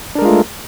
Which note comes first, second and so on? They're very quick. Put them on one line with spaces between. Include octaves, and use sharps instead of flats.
D4 A#4 G#3 F4 A3